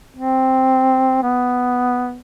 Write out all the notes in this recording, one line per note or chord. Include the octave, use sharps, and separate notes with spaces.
C4
B3